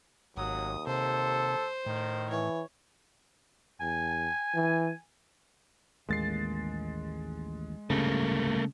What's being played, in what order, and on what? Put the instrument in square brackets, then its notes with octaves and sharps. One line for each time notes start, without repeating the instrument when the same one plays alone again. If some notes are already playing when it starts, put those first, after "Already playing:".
[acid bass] G#1 [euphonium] D#2 [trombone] F#3 [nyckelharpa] D#6
[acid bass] C3 [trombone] A4 [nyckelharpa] C5
[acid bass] A2 [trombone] D#3
[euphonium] E3 [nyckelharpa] C#5
[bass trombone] E2 [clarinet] G#5
[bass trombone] E3
[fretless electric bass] A1 D#2 A#3 [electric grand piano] G#3 A6 C7
[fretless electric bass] D1 C2 G2 [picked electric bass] C#3 [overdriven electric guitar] A3 A#3